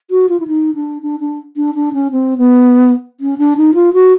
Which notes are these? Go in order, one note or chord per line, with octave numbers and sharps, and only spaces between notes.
F#4
F4
E4
D#4
D4
D4
D4
D4
D4
C#4
C4
B3
C#4
D4
D#4
F4
F#4